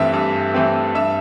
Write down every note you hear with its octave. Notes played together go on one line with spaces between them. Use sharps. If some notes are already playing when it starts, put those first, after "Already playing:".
Already playing: G2 E3 A3 C4 E5
G2
E3 A3 C4
G2 E5